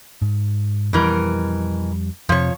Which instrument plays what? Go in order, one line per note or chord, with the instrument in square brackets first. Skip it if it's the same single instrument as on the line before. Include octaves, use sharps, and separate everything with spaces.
[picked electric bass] G#2
[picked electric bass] F2 G3 [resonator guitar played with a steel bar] B2 E3 A#4
[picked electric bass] F2 C3 [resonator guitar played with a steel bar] F3 C#5